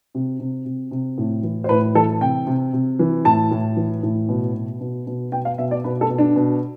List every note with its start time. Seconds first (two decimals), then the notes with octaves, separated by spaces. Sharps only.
0.15 C3
0.40 C3
0.65 C3
0.91 C3
1.18 A2
1.43 E3
1.64 C5
1.69 A2 B4
1.95 E3 A4
2.21 C3 G5
2.47 C3
2.73 C3
2.99 E3
3.25 A2 A5
3.51 A2
3.76 E3
4.03 A2
4.29 B2
4.54 B2
4.81 B2
5.07 B2
5.32 B2 G5
5.45 F5
5.58 B2 E5
5.71 D5
5.84 B2 B4
6.01 A4
6.09 B2
6.18 D4
6.36 B2